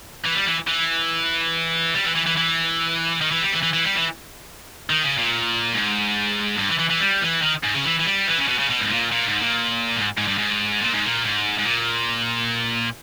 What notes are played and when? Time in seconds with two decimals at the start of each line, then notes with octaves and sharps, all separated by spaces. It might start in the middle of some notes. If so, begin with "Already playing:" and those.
0.25 E3
0.36 G3
0.47 E3
0.68 E3
1.94 G3
2.04 E3
2.15 E3
2.26 E3
2.37 E3
3.21 D#3
3.32 E3
3.42 G3
3.53 E3
3.63 E3
3.73 E3
3.84 G3
3.95 E3
4.90 D#3
5.04 C#3
5.18 A#2
5.74 G#2
6.59 G2
6.69 E3
6.79 E3
6.90 E3
7.01 G3
7.22 E3
7.43 D#3
7.64 G#2
7.75 C#3
7.85 E3
8.00 E3
8.06 G3
8.28 E3
8.38 C#3
8.48 B2
8.59 C#3
8.70 B2
8.81 G#2
8.91 A#2
9.12 A#2
9.26 G#2
9.40 A#2
9.96 G#2
10.18 G#2
10.28 G2
10.38 G#2
10.80 A#2
10.93 G#2
11.05 A#2
11.23 G#2
11.58 G#2
11.65 A#2